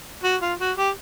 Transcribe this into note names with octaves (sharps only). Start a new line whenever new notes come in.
F#4
F4
F#4
G4